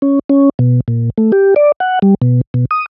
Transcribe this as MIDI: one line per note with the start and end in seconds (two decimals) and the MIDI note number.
0.02 0.19 61
0.30 0.49 61
0.59 0.80 47
0.88 1.10 46
1.18 1.32 57
1.32 1.54 67
1.56 1.72 74
1.80 1.99 78
2.02 2.15 55
2.22 2.41 47
2.54 2.65 47
2.71 2.86 87